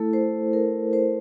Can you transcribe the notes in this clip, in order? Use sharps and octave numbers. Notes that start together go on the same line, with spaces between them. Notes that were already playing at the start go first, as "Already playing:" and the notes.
Already playing: A3 E4 A4
C5
A#4
C5